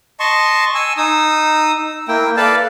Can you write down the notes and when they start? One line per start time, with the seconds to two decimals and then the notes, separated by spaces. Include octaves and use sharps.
0.20 D#5 A5 C6 C#6
0.75 G#5 E6
0.97 D#4 D#6 E6
2.08 A#3 E4 G5
2.37 A4 B4 D5 F5 A5